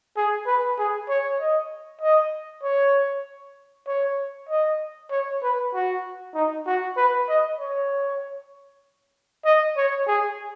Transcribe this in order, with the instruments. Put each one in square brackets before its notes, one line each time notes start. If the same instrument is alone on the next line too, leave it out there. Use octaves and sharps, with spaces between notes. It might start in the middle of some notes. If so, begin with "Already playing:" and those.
[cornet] G#4
B4
G#4
C#5
D#5
D#5
C#5
C#5
D#5
C#5
B4
F#4
D#4
F#4
B4
D#5
C#5
D#5
C#5
G#4